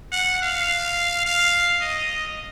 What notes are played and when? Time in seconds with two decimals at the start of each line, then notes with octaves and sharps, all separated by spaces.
0.12 F#5
0.42 F5
1.26 F5
1.81 D#5